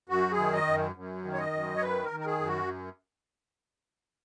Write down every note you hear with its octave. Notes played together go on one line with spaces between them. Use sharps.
F#2 F#4
G#4
D#3
D#5
F#2
F#2
D#3
C#5
D#5
F#2
C#5
D#3 B4
A#4
D#3
A#4
G#4
F#2
F#4